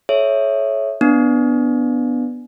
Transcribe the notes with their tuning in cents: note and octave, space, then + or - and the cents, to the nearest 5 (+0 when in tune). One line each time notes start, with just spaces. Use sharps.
A4 -35 C#5 +0 E5 +0
B3 +0 D4 +0